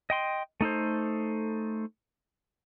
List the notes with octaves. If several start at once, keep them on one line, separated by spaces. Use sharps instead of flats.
D#5 G5 C6
A3 D#4 A4 C5